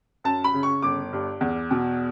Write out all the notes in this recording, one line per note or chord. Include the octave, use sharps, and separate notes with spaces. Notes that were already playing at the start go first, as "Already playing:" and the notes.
F#2 A5
B5
C#3
C#6
G1 D6
G2
E2
B2